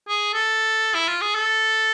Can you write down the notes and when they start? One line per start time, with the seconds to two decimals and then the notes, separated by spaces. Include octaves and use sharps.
0.08 G#4
0.34 A4
0.95 E4
1.08 F4
1.21 G#4
1.35 A4